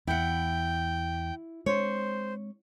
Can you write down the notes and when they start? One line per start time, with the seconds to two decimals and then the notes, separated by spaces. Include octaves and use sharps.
0.07 E2 E4 F#5 G5
1.66 G#3 C4 D4 C5 C#5